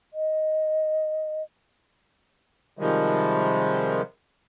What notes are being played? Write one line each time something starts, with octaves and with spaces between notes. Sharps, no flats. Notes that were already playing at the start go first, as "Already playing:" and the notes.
D#5
C3 D#3 F3 G3 G#3